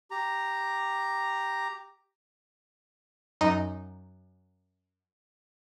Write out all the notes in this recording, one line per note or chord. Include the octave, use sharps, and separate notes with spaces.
G4 A#5
F#2 D#4 D#7